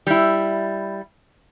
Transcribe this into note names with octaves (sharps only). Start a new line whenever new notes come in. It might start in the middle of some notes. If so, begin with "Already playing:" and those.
G3 E4